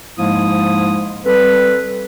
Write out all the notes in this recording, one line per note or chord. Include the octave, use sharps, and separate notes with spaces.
G#2 F3 G#3 A#3 E4 D#6
G3 C4 A4 B4